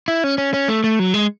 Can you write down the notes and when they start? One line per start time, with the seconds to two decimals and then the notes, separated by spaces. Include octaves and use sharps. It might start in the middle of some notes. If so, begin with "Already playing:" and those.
0.08 E4
0.24 C#4
0.38 C#4
0.54 C#4
0.68 A3
0.84 A3
0.99 F#3
1.14 G#3